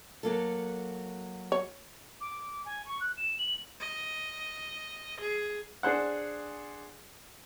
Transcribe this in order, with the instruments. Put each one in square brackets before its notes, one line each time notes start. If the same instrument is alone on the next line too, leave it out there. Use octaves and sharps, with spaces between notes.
[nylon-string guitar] F#3 A#3 A4
[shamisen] C#5
[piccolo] D6
G#5
C#6
F#6
E7
F#7
[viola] D#5
G#4
[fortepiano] D4 G#4 C5 F#5